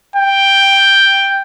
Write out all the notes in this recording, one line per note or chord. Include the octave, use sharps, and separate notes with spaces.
G5